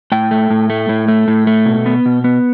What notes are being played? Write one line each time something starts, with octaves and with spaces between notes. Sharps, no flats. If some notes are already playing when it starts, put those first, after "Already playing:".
A2 G5
A3
A2
A3
A2
A3
A2
A3
B2
B3
B2
B3